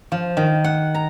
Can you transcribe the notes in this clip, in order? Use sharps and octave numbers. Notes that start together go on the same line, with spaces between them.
F3
D#3
F#5
A#5